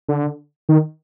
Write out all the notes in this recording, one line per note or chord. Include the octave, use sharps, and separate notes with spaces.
D3
D#3